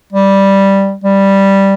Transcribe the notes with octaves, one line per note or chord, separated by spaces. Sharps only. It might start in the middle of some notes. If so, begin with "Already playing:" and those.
G3
G3